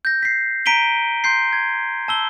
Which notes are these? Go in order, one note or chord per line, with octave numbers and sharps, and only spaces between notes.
G6 A#6
B6 C7
A#5 B6 D7 D#7 G7
C6 G6 C7
G#6
A5 E6 G7